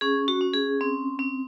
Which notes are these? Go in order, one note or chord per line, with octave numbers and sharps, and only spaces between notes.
C#4 G#4
F#4
C#4
G#4
C4
C4